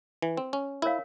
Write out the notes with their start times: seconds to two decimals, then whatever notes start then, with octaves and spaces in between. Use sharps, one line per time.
0.22 E3
0.37 C4
0.53 C#4
0.82 E4 A#4 C#5 F5